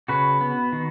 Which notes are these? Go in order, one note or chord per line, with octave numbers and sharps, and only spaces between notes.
C#3 F#4 B4
B3
D#3